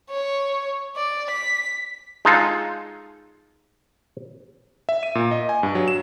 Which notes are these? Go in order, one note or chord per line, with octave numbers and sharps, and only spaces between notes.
C#5
D5
B6
G#3 D#4 F4 A4
E5
D#7
A#2
D#5
G#5
G2
F#3
E7